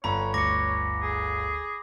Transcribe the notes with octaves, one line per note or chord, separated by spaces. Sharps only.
G1 C#5 A#5 B5
D2 D6 A#6 C#7
G#4